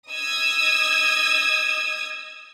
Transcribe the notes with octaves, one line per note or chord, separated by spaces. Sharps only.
D#5 D#6 E6 G#6